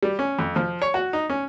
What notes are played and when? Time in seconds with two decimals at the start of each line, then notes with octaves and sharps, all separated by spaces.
0.03 G3
0.19 C#4
0.39 F2
0.56 F3
0.82 C#5
0.94 F#4
1.13 D#4
1.30 C#4